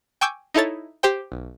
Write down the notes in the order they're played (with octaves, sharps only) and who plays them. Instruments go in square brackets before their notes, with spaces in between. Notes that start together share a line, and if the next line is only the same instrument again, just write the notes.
[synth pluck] G5 G#5 C#6 D6 E6 G6
D#4 E4 A4 C#5 A6
G4 C5 G5
B1